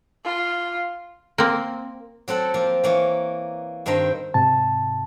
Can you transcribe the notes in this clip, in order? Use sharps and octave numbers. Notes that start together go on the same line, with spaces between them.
F4
A#3 C4
F#3 C4 A4 F#5
F3 A#3 A#4
E3 A#3 C#5
G2 D#3 C4 C5 A#5
G#2 C3 A5